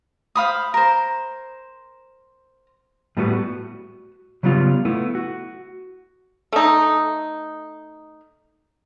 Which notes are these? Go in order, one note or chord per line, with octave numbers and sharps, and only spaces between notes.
C5 F5 B5 D#6
A#4 C5
A2 G3 A3 B3 D4 F#4
F#4
C#3 F#3 G3 B3 F4
A3 B3 E4
F#4
A3 D#4